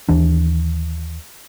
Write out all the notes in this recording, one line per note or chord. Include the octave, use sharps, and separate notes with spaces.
D#2 E3 D4